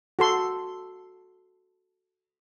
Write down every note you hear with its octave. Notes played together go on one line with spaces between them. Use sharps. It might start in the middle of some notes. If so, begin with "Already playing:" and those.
F#4 A4 C6